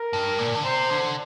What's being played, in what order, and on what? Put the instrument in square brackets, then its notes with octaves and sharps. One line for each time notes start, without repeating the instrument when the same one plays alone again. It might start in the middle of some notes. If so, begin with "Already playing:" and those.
Already playing: [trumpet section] A#4
[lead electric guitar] G2
A#2
D3
[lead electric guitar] C3 [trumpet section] C5
[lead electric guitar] D3